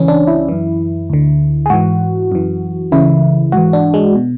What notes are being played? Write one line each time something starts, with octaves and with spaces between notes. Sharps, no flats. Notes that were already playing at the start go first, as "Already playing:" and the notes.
Already playing: C#2 C#3 E3 C#4
D4
E4
F#2 E3
D2 D3
G#4
G#2 E3 F#4
F#2 E3
C#2 C#3 E3 E4
G#2 E3 F#4
D4
G#3
B2